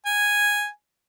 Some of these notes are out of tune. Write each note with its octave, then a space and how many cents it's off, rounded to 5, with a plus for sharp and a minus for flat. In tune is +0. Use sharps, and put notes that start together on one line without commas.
G#5 -5